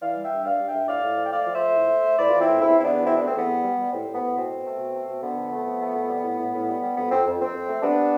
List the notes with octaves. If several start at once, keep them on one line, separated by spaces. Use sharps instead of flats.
E3 D5 F5
G3
E5 G5
G2
G2 D5 F5
G2
E5 G5
G2
A2 D5 F5
A2
F3
G5
A3 D5 F5
F3
C5 E5
A3
A2
A3
A3
A2 B4 D5
E3 F4
C4 E4
A2
E2 C4 E4
E2 E4
B3 D4
E2
B2 C4 E4
A3 B3 D4
C4
E2 B3
G3
G3
G3
A2 C4
A2
B3
A2
B2 C4
B2
A3
B2
A3
B2
D3 B3
F2
A3
F3
A3
F2
G3
A2
A2
A2
G3
G3
F2 B3
F2 C4
F2
F2 C4
F2
A3
G3 B3 D4